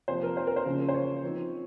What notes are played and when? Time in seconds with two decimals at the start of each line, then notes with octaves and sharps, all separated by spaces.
0.08 C3 F3 A#3 C5
0.23 A#4
0.37 C5
0.47 A#4
0.56 C5
0.66 C#3 F3 A#3 C#4
0.89 C5
0.94 C#5
1.24 F3 C4 D#4